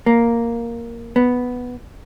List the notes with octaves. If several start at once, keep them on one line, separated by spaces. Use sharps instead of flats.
A#3
B3